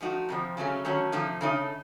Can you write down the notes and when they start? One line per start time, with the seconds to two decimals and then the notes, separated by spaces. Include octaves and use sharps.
0.01 F3 A3 D#4 F#4
0.29 F2 C3 F3
0.57 C#3 F#3 A3 C#4
0.85 D#3 F#3 A3 C#4
1.12 C3 F3 A3 D#4
1.41 C#3 A3 D#4